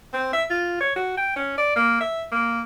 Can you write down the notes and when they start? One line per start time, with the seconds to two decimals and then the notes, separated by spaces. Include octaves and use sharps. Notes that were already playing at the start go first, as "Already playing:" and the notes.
0.14 C4
0.33 E5
0.50 F4
0.81 C#5
0.96 F#4
1.18 G5
1.36 C#4
1.58 D5
1.76 A#3
2.01 E5
2.32 A#3